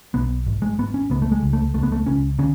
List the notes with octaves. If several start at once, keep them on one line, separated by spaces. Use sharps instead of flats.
B1 B3
G#1
G#3
G#1 B3
C#4
C#2 B3
A3
G#3
C#2
A3
C#2 A3
B3
A3
C#2 C#4
D3 C#4